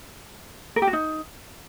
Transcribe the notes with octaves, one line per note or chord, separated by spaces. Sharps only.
A#4
G4
F#4
D#4